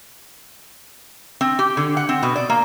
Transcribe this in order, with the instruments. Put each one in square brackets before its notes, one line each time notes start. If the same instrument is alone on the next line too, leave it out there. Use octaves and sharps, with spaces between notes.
[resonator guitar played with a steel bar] C4
G4
D3
F#5
C4
B2
D5
A#3